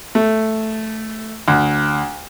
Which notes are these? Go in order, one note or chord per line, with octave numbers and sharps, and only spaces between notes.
A3
D2